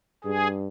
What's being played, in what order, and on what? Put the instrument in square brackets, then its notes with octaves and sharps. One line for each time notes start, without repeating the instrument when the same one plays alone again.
[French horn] G2 [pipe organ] G#4